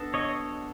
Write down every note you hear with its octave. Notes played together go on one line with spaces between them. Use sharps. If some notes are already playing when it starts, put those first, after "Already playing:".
Already playing: B3 D4 F#4 A4
C#5 D#5